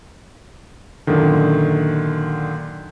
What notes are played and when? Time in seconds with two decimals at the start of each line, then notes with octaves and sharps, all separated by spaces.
1.07 F#2 A#2 D3 D#3